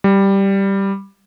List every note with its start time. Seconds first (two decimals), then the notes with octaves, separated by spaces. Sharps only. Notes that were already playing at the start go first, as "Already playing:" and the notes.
0.04 G3